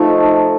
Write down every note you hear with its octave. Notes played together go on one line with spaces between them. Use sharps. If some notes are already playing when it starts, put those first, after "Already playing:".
Already playing: F3 A3 D#4 A4